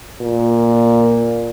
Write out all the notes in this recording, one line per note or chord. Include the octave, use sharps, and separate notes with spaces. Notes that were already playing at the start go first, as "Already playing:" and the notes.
A#2